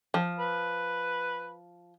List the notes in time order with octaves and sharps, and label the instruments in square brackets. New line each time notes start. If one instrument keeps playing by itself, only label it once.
[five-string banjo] F3
[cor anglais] B4